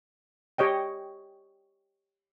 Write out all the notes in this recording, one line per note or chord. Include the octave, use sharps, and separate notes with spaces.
G4 C#5 D#5 G5